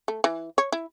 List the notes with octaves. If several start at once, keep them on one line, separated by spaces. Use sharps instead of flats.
A3
E3
C#5
E4